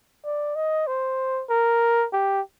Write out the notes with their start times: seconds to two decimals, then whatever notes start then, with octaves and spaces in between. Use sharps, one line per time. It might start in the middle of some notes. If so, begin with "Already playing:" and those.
0.25 D5
0.56 D#5
0.87 C5
1.50 A#4
2.13 G4